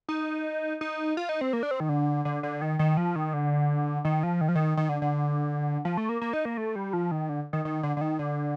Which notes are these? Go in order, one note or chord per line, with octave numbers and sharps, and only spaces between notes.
D#4
D#4
F4
D#4
C4
A#3
D4
C4
D#3
D3
D3
D3
D#3
D#3
F3
D#3
D3
D#3
F3
D#3
F3
D#3
D#3
D3
D3
F3
A3
A#3
A#3
D#4
A#3
A3
G3
F3
D#3
D3
D#3
D#3
D3
D3
D#3
D3